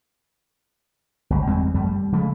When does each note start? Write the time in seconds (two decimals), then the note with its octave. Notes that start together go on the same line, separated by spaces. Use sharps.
1.30 G1 C#2
1.47 E2 G3 G#3 C4
1.74 F#2 G3 A3
1.86 G3
2.12 C#3 F3 G#3 A3